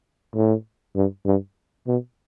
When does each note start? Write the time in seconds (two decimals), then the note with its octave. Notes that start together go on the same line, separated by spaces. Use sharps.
0.35 A2
0.96 G2
1.26 G2
1.87 B2